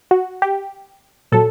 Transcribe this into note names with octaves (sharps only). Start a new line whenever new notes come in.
F#4
G4
A#2 F#3 A4